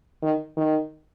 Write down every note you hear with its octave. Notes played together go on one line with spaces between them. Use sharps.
D#3
D#3